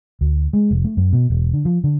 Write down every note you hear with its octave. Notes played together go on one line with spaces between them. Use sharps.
D2
G#3
F1
A3
F#2
B2
E1
D3
F3
D3